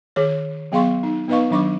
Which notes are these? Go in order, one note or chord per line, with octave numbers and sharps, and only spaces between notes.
D#3 G#4 C#5
F#3 B3 G#4 F5 C6 C#6
D#4
B3 D#4 B4 D#5 F5 C#6
D#3 F#3 D4 C#6 D6